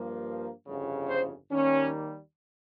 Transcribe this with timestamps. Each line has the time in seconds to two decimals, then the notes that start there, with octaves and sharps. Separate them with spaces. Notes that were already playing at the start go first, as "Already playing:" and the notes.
Already playing: G2 F3 A#3
0.67 G1 F2 C#3
1.09 C5
1.51 D#2 D#3 G3 A#3 C#4